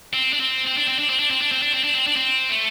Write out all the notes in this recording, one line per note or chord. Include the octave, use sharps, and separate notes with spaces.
C4
D4
C4
C4
D4
C4
D4
C4
D4
C4
D4
C4
D4
C4
D4
C4
D4
C4
A3